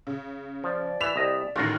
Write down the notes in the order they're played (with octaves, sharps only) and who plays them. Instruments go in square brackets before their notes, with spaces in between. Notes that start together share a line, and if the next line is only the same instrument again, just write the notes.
[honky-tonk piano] C#3
[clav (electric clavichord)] F3 [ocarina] D5
[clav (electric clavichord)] E3 [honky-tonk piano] B6 E7 F7
[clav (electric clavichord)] C2 D#5
[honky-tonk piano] A1 A2 D#3 [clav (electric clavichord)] F4 F#4 A#4